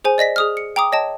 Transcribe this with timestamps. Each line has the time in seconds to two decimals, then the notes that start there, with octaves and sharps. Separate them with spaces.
0.04 G#4 C5 G#5
0.18 D5 D#5 A#6 B6
0.36 G#4 D#6 F6
0.57 C#7
0.76 G5 A#5 D6 D#6
0.92 C#5 D#5 G5 A5